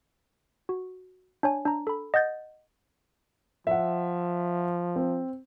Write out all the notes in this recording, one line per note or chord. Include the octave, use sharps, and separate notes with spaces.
F#4
D4 C#5 G#5
D4 A#5
A4 B5
D#5 F#5 G6 A6
F3 E5 F#5
C4